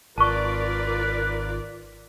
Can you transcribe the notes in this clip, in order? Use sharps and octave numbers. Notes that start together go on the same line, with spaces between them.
G#1 F4 A#4 B4 D5 A5 C#6